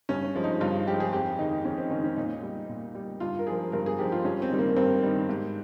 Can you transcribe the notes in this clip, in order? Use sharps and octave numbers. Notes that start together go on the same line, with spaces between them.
G2 C#4
F3 G#3
D#4
G2 F4
F3 G#3 G4
G#4
F2 G4
D#3 G#3 D#4
F2 C#4
C4
D#3 G#3 C#4
C#4
A#2 D#4
G3
A#2
G3
G2 F4
A#4
F3 G#3 G#4
G2 A#4
G#4
F3 G#3 G4
F4
G2 C#4
C4
D#3 G3
A#3
G2 C4
D#3 G3
G#2